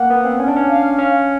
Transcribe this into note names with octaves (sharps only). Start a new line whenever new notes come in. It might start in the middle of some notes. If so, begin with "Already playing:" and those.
Already playing: A#3 F#5
B3
C4
C#4
D4
C#4
F5
C#4